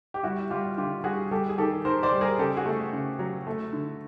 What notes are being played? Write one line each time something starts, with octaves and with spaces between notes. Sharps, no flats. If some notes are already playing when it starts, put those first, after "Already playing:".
G4
G3 E4 F#4
G3 F4 G4
D3 F4 G4
G3 F#4 G#4
G3 G4 A4
G#4
D#3 G4 A4
D#3 A#4 C5
C5 D5
G3
G#4 A#4
C#3 G4 A4
F#4 G#4
A3
C#3
F#3
A3
D3